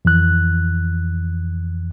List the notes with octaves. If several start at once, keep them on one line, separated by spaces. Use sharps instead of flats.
F2 E3 F#6